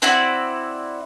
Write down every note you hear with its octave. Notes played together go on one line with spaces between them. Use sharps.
C4 E4 F#4 D5